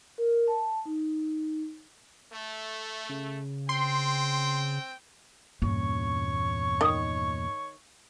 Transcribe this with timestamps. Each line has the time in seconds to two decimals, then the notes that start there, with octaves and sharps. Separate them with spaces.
0.18 A#4
0.48 A5
0.85 D#4
2.33 A3
3.09 C#3
3.69 C4 G5 C6
5.62 E2 G2 A#2 A#3 C#4 C#5 C#6
6.81 D#3 D#5